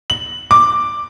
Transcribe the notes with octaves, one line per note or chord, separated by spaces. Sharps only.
F#7
D6